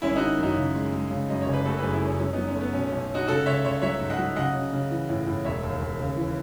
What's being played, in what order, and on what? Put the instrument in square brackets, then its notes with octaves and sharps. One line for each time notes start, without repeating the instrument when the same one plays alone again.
[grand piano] G#1 [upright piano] C#4 E4
[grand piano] D#3 [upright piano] D#4 F#4
[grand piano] F#2 [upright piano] D#4 F#4
[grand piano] C#3
G#3
G#3
C#3
[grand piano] F#2 [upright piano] D#5
[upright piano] C#5
[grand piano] F#1
[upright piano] B4
[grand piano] A3 [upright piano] F#4 A4
[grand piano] F#2 [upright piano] G#4 B4
[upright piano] E4 G#4
[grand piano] F#2 [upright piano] C#4
[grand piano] F#3 [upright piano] C#4
[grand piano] F#3 [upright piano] B3 D#4
[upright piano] C#4
[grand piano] A3
[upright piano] B3
[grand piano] B1 [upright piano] C#4
[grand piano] B1 [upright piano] C#4
[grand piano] C#4 [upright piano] D#4 F#4
[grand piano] C#3 [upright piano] F#4 A4
[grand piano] C#2 [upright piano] C#5 E5
[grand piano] C#2 [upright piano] C#5 E5
[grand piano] F#3 [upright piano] C#5 E5
[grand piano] G#2
[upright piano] D#5 F#5
[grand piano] F#3
[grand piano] C#3 [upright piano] D#5 F#5
[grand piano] C#3
C#3
E3
A2
A2
[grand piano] E1 [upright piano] C#5 E5
[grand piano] D#2
D#2
C#3
E3